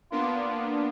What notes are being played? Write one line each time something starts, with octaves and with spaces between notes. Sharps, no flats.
A#3 B3 D4 F4